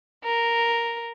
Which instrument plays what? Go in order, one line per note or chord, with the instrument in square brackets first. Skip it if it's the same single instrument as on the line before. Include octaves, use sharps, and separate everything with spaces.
[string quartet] A#4